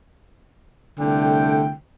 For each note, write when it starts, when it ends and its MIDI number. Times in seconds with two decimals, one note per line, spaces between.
0.99 1.73 36
0.99 1.73 50
0.99 1.73 57
0.99 1.73 79